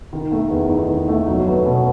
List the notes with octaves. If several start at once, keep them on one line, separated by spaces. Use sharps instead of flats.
D#3
A3
E2
D#4
D#3
A3
F#3
B3
B2